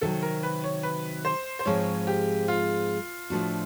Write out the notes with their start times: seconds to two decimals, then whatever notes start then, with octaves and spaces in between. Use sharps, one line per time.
0.01 C3 D#3 F#3 A4
0.22 A#4
0.43 B4
0.64 C#5
0.83 B4
1.25 C5
1.59 C5
1.65 G#2 F3 G#3 C4 C#5
2.07 G4
2.48 F4
3.30 A2 F3 A3 D4 F#4